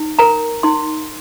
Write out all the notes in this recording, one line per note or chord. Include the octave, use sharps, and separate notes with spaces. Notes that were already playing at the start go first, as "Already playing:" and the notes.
Already playing: D#4
A#4 A#5
D#4 C6